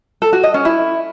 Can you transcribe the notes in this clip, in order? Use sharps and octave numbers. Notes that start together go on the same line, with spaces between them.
A4
F#4
D#5
C#4
E4